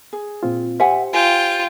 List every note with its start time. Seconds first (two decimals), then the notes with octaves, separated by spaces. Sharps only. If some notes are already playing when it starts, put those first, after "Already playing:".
0.13 G#4
0.43 A#2 C4 F4
0.80 G4 C5 E5 F#5 G#5
1.13 F4 G5 G#5